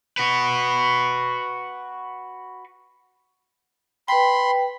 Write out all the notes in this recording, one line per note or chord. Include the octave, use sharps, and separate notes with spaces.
F#4 B4
B4 G5 B5 C6